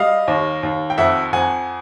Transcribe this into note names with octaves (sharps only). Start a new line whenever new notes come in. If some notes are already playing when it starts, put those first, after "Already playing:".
Already playing: G3 D#5 F5
D#2
D#2
G5
F2 E5 F#5
F2 F#5 G#5